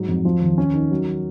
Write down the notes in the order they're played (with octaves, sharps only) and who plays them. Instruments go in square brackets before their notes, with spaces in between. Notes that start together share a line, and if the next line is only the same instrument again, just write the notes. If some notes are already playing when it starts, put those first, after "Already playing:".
Already playing: [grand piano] G#2 F#3
F2
F3
D#2
C#4
D#3
F#3